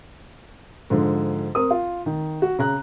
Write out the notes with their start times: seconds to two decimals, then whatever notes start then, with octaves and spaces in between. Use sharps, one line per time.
0.90 G#2 D3 F3
1.55 C4 A#4 D#6
1.71 F4
2.06 D#3
2.42 F#4
2.59 C#3 A#5 F#6